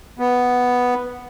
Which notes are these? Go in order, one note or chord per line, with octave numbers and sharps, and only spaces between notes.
B3